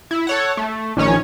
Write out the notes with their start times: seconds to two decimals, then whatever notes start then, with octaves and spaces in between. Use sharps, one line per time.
0.11 E4
0.27 A4 C#5 F#5
0.57 A3
0.97 A#1 D#3 C#4 C#5